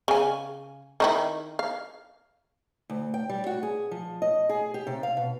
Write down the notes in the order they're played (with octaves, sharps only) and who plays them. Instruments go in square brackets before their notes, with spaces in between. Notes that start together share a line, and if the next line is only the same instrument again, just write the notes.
[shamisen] C#3 G#5
D#3 D#4 E4
F5
[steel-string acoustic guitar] D2
G5
G3
F#4
G#4
F3
D#5
G#4
G4
C3
F5
B2